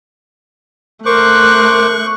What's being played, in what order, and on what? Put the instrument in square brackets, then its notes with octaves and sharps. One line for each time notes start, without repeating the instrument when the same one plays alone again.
[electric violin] A3 F#6 [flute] A#4 [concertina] C5 D6 [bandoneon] C#6